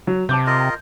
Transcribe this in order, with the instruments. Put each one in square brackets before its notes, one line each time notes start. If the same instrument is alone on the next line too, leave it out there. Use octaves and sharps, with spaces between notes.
[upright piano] F#3
[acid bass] C3 [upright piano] A5 D6 G6
[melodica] F4 A#4 D#5